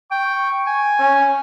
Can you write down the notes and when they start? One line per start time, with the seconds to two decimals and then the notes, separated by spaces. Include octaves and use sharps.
0.11 G5 C#6
0.67 G#5
0.99 C#4